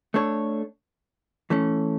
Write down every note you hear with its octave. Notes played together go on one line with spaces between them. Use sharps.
A3 D4 A4 C#5
E3 A3 C#4